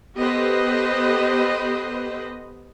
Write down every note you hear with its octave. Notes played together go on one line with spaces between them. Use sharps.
B3 G4 A4 B4 C5 D#5